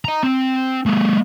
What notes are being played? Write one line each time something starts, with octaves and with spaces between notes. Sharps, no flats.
D#5 A#5
C4
G#3 A#3